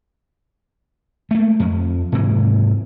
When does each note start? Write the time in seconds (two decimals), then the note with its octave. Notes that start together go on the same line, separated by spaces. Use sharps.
1.31 A3 A#3
1.60 F2
2.12 G#2 C3 E3